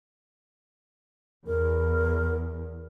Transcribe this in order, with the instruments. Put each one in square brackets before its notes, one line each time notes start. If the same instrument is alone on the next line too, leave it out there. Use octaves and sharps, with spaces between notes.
[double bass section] E2 [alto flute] A#4